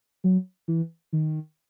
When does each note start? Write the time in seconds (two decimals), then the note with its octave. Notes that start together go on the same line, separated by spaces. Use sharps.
0.24 F#3
0.68 E3
1.13 D#3